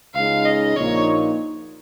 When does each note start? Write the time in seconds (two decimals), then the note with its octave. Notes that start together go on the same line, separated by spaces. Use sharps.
0.14 C#2 C#3 G#3 D#4 F5
0.45 D#5
0.76 A#1 A#2 A#3 D#4 C#5